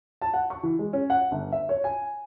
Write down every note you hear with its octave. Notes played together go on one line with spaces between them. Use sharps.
A5
F#5
C#6
E3
G#3
C#4
F#5
G1
E5
C#5
G#5